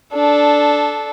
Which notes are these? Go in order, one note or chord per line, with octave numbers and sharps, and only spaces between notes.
D4 A4